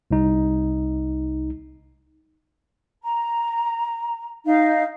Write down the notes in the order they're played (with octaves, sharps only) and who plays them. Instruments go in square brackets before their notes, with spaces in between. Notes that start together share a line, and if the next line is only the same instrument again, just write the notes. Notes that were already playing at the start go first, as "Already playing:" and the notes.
[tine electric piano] C2 D#4
[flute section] A#5
D#4 F5